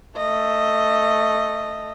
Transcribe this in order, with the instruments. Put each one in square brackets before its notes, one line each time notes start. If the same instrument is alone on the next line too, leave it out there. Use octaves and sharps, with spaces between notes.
[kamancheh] A3 D#5